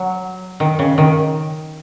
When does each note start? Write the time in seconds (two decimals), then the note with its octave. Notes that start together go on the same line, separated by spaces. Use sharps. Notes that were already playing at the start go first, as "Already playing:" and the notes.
Already playing: F#3
0.60 D#3
0.79 C#3
0.98 D#3